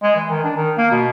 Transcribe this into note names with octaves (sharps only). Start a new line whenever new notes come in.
G#3
E3
D#3
D4
D#3
A#3
B2